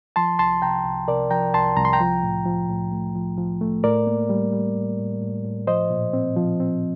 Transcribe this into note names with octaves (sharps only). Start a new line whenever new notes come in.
F3 A5 C6
C2 A5 C6
C3 G5 A#5
C2
C3 A#4 D5
F3 G5 A#5
C2 A5 C6
C2 A#5
C6
G5 A#5
F3
A2
F3
A2
A3
F3
F3
A3
A2 A#4 D5
A#3
G3
G3
A2
A2
A2
A2
F3 C5 D#5
A#2
C4
F3
C4